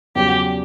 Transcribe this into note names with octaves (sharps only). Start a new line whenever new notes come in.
E2 C#3 F#3 G4